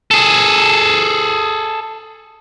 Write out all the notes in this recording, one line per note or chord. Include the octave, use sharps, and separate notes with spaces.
G#4 A4